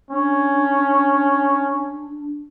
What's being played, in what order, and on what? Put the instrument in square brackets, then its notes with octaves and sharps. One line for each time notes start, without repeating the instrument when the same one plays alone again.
[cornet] C#4 [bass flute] D4